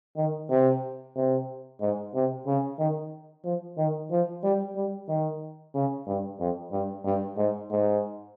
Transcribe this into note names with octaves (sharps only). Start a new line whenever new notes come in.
D#3
C3
C3
G#2
C3
C#3
D#3
F3
D#3
F3
G3
G3
D#3
C#3
G2
F2
G2
G2
G#2
G#2